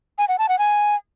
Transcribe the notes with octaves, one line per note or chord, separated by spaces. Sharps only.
G#5
F#5
A5
F#5
G#5